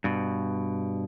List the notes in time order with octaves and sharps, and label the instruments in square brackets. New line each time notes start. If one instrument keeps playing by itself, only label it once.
[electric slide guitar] G2 B2